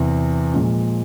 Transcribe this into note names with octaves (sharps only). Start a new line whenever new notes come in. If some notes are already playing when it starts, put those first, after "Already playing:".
Already playing: E2 C3 E3
A#2 F3 G#3